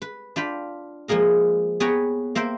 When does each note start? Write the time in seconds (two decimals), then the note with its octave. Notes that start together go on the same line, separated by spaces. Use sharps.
0.02 B4
0.36 D4 F4 G5 B5
1.08 F3 G#3 A#3 G#4 A#4
1.80 B3 G#4 B4 C#5 G5 A#5
2.35 A#3 C5 E5 G5